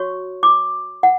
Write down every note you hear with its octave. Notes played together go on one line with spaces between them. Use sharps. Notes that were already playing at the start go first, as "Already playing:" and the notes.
Already playing: F#4 C#5 C#6
D6
F#5